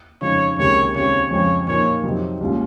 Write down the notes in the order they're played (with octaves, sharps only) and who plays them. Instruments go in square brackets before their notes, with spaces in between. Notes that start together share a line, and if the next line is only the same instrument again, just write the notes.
[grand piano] F2 C#3 G#3 D#4 [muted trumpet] C#5
[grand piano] C#2 C3 D#3 A#3 C#4 [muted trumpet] C#5
[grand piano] D#2 C#3 G#3 C4 [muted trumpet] C#5
[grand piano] F2 C#3 F3 G#3 C4 [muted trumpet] C#5
[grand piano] A#2 F3 A#3 D#4 [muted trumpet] C#5
[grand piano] F2 C3 F#3 C4 D#4
C2 A#2 G#3 C#4 F4